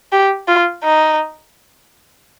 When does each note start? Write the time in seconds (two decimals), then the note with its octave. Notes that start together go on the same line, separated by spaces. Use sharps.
0.12 G4
0.48 F4
0.84 D#4